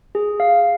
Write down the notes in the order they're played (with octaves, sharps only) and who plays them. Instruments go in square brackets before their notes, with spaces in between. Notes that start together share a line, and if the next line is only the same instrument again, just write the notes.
[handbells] G#4
F5